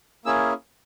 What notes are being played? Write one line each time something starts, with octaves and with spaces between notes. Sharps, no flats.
A#3 C#4 E4 G#4 E6